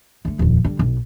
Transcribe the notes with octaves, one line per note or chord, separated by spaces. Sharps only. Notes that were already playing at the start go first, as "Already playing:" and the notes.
D3 A3
D#1 F2
D3 G3
B1